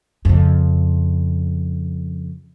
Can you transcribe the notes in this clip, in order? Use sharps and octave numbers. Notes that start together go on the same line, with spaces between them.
F2 C#3